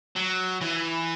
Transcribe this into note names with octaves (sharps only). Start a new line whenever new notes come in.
F#3
E3